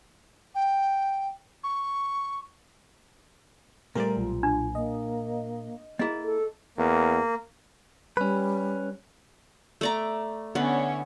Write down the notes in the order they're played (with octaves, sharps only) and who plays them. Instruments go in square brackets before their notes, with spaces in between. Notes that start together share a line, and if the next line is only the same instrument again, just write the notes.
[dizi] G5
C#6
[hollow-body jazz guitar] A#2 C5 D5 [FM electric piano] G3 A3 A#4
[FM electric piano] B1 [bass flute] F4
[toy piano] D4
[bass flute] A#3 [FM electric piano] D#5
[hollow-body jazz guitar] A#3 E4 [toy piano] G#4 D#5
[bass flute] A4
[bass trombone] E2 [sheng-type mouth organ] A#3
[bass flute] G3 [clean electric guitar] C#4 B4
[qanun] A3 D5 A#5
[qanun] D3 B3 [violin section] C#4 E4 C#5